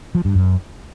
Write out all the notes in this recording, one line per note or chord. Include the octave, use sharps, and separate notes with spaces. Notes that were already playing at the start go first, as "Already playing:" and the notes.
F3
G2
F#2